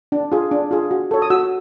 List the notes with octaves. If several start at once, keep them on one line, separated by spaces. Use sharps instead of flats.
D4
F4 G#4
D4
F4 G#4
F#4
A4 C#5
D#6
F#4 E6